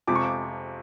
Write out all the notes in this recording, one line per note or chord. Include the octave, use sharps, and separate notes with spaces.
F2 C3 F3 G#3 D6
C#6
D6